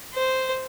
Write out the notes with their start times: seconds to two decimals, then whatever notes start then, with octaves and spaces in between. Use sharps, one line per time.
0.14 C5